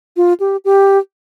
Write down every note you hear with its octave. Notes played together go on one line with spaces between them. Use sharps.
F4
G4
G4